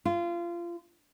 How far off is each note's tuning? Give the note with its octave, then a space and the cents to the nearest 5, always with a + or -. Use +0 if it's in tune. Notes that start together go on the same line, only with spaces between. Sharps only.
F4 -25